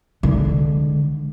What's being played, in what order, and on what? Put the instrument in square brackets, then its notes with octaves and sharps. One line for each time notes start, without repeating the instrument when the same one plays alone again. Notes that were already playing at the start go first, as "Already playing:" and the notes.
[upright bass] D3 G#3